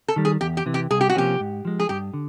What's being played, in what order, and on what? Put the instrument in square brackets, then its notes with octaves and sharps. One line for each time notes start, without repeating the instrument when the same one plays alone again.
[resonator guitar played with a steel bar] A4
[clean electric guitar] D#3 G3
[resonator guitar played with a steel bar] G#4
[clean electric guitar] E2 [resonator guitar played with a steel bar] G4
[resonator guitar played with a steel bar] G4
[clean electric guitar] C3 E3
[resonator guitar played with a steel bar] G4
[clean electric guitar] C2 [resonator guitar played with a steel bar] G#4
[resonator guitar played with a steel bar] G4
F#4
[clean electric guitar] C3 F3 A#3 C#4 [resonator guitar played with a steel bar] G4
[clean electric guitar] G#2
F3 G#3
[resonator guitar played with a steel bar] G#4
[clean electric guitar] G2 [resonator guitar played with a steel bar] G4
[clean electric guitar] D3